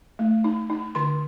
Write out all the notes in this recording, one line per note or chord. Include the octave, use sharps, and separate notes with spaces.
A3
D#4
D#4
D3 C6